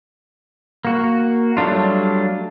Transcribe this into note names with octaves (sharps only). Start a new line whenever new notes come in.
A#3 F#4
F#3 G3 A3 D4 F4